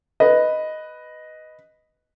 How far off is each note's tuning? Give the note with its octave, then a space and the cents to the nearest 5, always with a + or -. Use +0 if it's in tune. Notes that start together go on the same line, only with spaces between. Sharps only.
B4 +0 D#5 +0